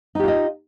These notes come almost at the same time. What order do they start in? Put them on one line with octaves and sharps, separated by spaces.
D#4 G4 F4 D#5